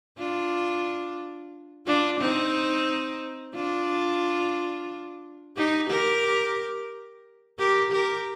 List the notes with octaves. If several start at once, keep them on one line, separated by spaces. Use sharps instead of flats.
D4 F4
D4 F4
C4 D#4
D4 F4
D#4 G4
G4 A#4
G4 A#4
G4 A#4